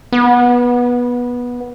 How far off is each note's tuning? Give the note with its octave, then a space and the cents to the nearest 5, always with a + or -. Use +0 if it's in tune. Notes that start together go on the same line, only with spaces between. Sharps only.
B3 -15